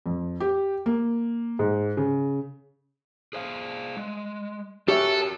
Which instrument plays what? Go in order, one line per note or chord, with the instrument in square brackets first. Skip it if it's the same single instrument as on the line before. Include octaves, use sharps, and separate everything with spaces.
[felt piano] F2
G4
A#3
G#2
C#3
[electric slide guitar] G#4 C5 F5
G#3
[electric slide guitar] F#4 A#4 [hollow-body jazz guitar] G4 C#5 E5 [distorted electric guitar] A4